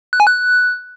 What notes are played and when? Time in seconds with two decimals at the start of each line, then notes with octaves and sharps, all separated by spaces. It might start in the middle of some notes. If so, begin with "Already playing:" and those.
0.13 F#6
0.20 G#5
0.27 F#6